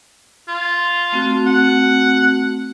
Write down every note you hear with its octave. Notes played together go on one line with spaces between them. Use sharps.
F4
A3 C4 F#4
F#5